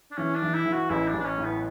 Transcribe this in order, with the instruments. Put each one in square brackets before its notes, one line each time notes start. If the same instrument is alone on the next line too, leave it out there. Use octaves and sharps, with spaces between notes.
[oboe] D4
[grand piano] E3 [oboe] C#4
[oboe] D4
[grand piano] E3
[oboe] E4
[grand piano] E3
[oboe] F#4
[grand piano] A1 [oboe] E4
[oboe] D4
[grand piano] A1
[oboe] D4
C#4
[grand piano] A2
[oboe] B3